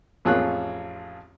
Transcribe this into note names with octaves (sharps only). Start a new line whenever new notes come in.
A1 F2 F4 G#4 C#5 F#6